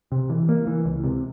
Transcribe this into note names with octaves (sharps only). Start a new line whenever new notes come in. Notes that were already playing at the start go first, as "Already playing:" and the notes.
C3
E3
A#3
E3
C#2
C3